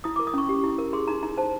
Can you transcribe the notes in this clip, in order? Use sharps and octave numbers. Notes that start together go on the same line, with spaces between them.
E4 D#6
A#4 D6
D#6
C#4 C#6
G4
E4
A#4
G#4 C6
D#4 A#5
D#4 A#5
C5 A5